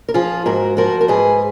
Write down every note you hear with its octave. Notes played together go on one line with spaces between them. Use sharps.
A#4
F3 F4 G#4
G#2 F#4 A#4
F3 F#4 A#4
A#4
G#2 G#4 B4